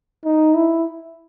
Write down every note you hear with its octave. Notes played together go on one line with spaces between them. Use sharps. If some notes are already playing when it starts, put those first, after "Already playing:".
D#4
E4